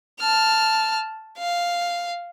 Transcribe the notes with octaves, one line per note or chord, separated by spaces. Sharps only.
A5 F6
F5